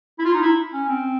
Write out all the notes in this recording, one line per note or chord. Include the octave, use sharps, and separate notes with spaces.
E4
F4
D#4
E4
C#4
C4